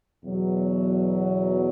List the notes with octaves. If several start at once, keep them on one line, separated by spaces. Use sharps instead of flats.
E2 B2 F#3